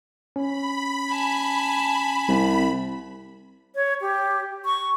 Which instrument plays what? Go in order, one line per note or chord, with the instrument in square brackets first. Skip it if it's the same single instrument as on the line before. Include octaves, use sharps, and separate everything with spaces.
[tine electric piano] C#4 [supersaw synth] B5
[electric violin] G#5 A5
[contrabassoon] C2
[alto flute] C#5
G4
C#6